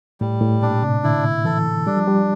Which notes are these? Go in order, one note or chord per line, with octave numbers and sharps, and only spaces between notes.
A2 G3
A2
A#2 D4
C3
D3 E4
E3 A4
G3 D4
F3
G3